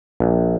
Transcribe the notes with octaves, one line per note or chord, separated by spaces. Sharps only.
A#1